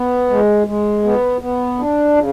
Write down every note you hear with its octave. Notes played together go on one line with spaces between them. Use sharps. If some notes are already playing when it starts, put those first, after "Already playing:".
Already playing: B3
G#3
G#3
B3
B3
D4
C#3